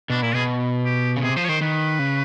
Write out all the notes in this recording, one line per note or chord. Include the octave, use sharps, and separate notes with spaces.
B2 D4
A#2 E4
B2 G#4
G4
C#3
C3 G#4
F3 C5
C#5
D#3 C5
D#3 B4
C#3